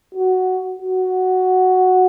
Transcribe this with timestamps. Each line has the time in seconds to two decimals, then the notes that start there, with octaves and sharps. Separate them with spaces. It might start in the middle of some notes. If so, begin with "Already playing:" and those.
0.15 F#4
0.79 F#4